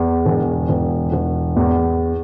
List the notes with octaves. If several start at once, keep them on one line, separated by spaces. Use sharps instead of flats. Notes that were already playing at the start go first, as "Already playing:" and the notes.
Already playing: E2
E1
E1
E1
E2